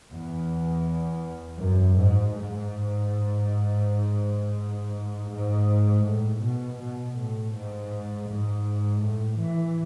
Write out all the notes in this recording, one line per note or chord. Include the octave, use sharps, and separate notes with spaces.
E2
F#2
G#2
G#2
G#2
A2
B2
B2
A2
G#2
G#2
A2
E3